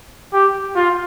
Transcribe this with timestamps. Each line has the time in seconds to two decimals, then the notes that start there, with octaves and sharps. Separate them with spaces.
0.33 G4
0.76 F4